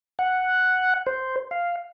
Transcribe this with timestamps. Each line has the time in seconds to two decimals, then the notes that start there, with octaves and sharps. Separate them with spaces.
0.19 F#5
1.07 C5
1.51 F5